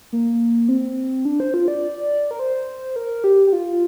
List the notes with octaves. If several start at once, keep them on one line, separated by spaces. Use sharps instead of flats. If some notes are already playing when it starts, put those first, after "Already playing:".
A#3
C4
D4
C5
F4
D5
A#4
C5
A#4
G4
G4
F4